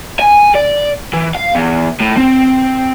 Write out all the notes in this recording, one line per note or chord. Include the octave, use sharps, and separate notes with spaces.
G#5
D5
E3
F5
E2
A2
C4